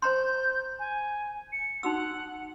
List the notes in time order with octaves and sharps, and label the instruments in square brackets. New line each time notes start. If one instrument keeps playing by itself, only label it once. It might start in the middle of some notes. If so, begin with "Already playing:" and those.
[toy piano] C5 A#5 C6 [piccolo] G6
[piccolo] G#5
C#7
[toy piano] D#4 F#4 E6 [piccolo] F#5